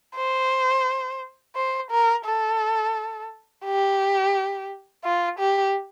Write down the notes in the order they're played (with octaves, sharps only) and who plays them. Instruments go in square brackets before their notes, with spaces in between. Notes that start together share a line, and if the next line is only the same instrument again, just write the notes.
[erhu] C5
C5
A#4
A4
G4
F4
G4